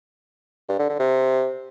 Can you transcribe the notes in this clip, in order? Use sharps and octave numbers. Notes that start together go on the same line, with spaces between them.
G2
D3
D3
C3